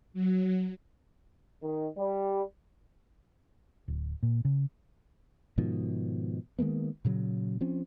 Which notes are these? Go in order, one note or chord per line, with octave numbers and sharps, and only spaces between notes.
F#3
D#3
G3
D1
A#2
C#3
G#2 B2 D#3 F3
D#3 G#3 A#3 B3
A#2 C#3 F#3
F3 C4 C#4